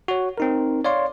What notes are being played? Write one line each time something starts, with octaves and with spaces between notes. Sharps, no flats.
F#4 C#5
C4 D#4 A#4
C#5 D5 F5 C6